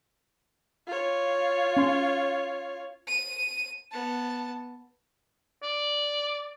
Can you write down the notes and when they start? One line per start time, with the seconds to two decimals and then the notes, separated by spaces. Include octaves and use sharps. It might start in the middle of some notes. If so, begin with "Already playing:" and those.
0.87 F4 C#5
1.77 C#4 C6
3.07 D#7
3.92 B3 A5
5.63 D5